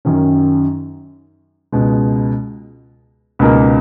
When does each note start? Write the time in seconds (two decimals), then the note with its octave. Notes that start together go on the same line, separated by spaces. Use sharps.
0.05 F#2 D#3 F#3 C#4
1.72 C#2 B2 G#3
3.39 C#2 B2 A#3 D#4 A#4